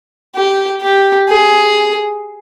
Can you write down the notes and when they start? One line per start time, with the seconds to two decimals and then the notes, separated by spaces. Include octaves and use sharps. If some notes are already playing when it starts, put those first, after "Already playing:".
0.36 G4
0.82 G4
1.29 G#4